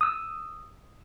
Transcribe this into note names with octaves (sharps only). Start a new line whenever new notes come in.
D#6 E6